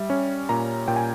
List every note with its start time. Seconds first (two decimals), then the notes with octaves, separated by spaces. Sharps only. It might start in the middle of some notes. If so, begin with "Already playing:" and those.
Already playing: G3 E5
0.10 C#4
0.49 A#2 A#5
0.88 A#2 G5
0.96 G#5